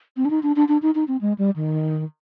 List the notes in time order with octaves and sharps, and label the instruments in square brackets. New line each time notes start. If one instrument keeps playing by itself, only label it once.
[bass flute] C4
D4
D#4
D4
D4
D4
D#4
D#4
C4
G#3
G3
D#3